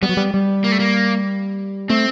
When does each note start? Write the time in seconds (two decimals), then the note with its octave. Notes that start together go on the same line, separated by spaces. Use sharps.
0.02 G3 B3
0.09 F#3
0.17 G3
0.34 G3
0.64 A#3
0.72 A3
0.79 A#3
1.90 A3 C4